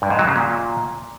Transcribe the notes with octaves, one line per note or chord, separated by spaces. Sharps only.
G2
G#2
F#3
C#3
A#2